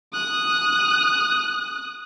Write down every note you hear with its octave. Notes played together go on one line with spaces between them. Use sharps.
D#6 F#6